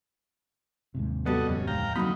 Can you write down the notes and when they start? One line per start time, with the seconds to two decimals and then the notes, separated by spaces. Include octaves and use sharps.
0.95 D#2 G#2 C3
1.26 G3 B3 F#4 A4 D#5
1.49 D1 F2 C#3
1.67 G#2 F5 G5 A#5
1.96 D2 F3 F#3 A#3 C4 D#4 B5